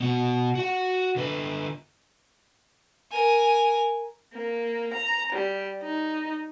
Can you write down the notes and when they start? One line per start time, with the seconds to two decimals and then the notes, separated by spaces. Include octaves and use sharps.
0.01 B2 F#4
0.55 F#4 F#5
1.16 D3 B4
3.12 A#4 G#5
4.35 A#3
4.95 A#5
5.34 G3
5.83 D#4